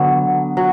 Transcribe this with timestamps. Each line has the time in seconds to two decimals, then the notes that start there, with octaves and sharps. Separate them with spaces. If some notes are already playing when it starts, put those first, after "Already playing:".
Already playing: D3 F#3 B3
0.57 F#3